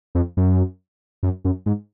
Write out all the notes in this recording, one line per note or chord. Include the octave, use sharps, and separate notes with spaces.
F2
F#2
F#2
F#2
G#2